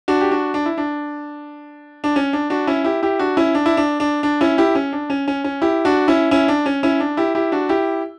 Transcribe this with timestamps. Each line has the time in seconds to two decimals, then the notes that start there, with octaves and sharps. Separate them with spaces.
0.08 D4 F#4
0.21 G4
0.31 D4 F#4
0.54 D4
0.66 E4
0.78 D4
2.04 D4
2.16 C#4
2.33 D4
2.50 D4 F#4
2.67 C#4 E4
2.84 E4 G4
3.03 E4 G4
3.19 D4 F#4
3.37 C#4 E4
3.55 D4
3.66 E4
3.77 D4
4.00 D4
4.23 D4
4.41 C#4 E4
4.58 E4 G4
4.75 C#4
4.93 D4
5.10 C#4
5.28 C#4
5.44 C#4
5.62 E4 G4
5.85 D4 F#4
6.08 C#4 E4
6.31 C#4 E4
6.48 D4
6.66 C#4
6.83 C#4 E4
7.00 D4
7.17 E4 G4
7.35 E4 G4
7.52 D4 F#4
7.69 E4 G4